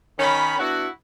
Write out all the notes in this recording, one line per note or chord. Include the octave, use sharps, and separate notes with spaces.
D#3 C#4 B5
B3 D4 E4 F#4